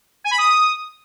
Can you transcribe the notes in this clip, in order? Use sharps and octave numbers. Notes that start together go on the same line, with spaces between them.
G#5
B5
D#6